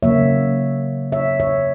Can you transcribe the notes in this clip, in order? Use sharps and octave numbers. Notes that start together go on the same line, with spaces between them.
C#3 F#3 A#3 C#5 E5
C#5 E5
C#5 E5